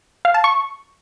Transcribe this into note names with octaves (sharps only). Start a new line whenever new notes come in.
F5
A5
C#6